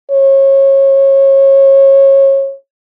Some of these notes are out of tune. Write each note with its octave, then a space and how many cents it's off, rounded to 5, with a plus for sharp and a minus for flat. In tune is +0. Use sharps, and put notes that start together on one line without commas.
C#5 -25